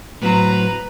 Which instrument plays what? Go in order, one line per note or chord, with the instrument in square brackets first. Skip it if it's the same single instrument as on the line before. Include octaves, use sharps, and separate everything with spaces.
[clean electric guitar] A2 F#3 C4 [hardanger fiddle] B4 A#5